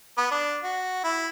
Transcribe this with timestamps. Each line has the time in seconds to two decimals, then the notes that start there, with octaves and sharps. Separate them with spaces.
0.18 B3
0.31 D4
0.63 F#4
1.04 E4